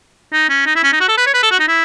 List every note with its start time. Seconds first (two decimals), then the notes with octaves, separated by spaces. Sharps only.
0.33 D#4
0.49 C#4
0.66 D#4
0.76 E4
0.84 C#4
0.93 D#4
1.00 F#4
1.09 A4
1.18 B4
1.26 C#5
1.34 B4
1.43 A4
1.51 F#4
1.60 D#4
1.68 E4